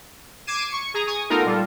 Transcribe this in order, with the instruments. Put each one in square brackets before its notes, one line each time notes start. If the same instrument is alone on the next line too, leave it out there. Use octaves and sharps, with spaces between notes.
[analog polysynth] D6 G#6 C7 D#7 E7
C#6 C#7
G#4 A#5
G#5 C#6 D#6
A3 B3 D#4 F4 A4 A#4
A#2 G3 F4 A4